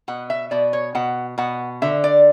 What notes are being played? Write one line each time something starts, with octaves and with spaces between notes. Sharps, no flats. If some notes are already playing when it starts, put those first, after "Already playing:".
B2 F#5
E5
B2 D5
C#5
B2 F#5
B2 F#5
D3 E5
D5